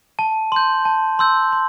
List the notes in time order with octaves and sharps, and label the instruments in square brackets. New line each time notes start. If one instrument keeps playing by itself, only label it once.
[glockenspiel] A5
C6 G6
A5
C6 E6 G6
C6